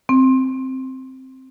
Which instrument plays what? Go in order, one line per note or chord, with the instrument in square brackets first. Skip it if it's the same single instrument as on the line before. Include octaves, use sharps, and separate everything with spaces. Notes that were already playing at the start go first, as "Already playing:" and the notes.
[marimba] C4